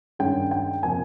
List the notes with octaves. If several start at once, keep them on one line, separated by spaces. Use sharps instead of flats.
G2 D#3 G#3 C#4 G5
G5
C3 F3 A#3 G#5